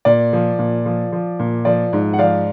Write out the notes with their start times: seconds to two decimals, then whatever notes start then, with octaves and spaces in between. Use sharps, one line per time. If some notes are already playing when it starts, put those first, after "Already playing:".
0.05 A#2 D5
0.33 F3
0.59 A#2
0.86 F3
1.12 F3
1.39 A#2
1.65 F3 D5
1.93 G#2
2.13 F#5
2.19 F3 D5 F5